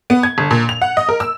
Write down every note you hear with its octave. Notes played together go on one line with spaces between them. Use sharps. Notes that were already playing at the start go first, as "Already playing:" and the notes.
B3
G#6
G1
A#2
F7
F#5
D#5
A#4
E6